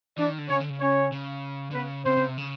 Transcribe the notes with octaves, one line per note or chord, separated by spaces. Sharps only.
E3 D4 D5
D#3
D3
C#3 C#4 C#5
D3
C#3
C#4 C#5
C#3
D3
C#3 B3 B4
C#3 C4 C5
C#3
C3
C#3